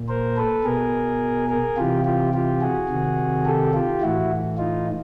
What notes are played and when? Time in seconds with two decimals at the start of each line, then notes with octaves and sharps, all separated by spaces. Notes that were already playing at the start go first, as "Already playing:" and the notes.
Already playing: A#2
0.09 A#4 C5
0.37 A4 B4
0.65 B2 G#4 A#4
1.49 G#4 A#4
1.77 C3 E3 F4 G4
2.05 F4 G4
2.34 F4 G4
2.61 F#4 G#4
2.89 C3 D#3
3.45 G4 A4
3.73 F4 G4
4.01 A2 E3 E4 F#4
4.58 D#4 F4